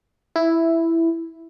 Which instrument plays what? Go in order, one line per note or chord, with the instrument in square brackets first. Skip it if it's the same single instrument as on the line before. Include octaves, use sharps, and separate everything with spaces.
[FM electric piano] E4